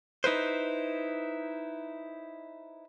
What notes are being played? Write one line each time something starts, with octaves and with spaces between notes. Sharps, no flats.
D#4 E4 B4 C5